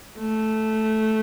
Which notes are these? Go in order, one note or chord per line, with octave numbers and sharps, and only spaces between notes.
A3